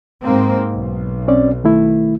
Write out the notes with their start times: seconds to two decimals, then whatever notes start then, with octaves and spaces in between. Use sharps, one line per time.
0.22 G#2 A#3 C4
0.71 B1
1.28 C4 C#4 D5
1.64 D#3 A3 E4